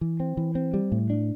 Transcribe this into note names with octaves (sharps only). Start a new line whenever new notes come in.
E3
C4
E3
C4
G3
A2
D4